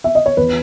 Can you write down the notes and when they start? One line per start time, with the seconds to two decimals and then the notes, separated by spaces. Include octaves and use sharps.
0.04 E5
0.15 D#5
0.26 C#5
0.37 E2 B4